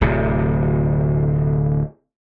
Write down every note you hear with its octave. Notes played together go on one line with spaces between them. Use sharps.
D1 D2 C3